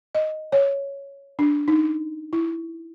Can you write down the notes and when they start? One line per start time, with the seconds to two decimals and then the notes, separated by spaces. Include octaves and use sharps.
0.15 D#5
0.52 C#5
1.39 D4
1.68 D#4
2.33 E4